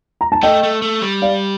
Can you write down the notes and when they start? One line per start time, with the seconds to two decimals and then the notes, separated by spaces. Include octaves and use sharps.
0.21 A#5
0.32 A5
0.43 A3 D#5 G5
0.63 A3
0.82 A3
1.02 G3
1.22 D5 F5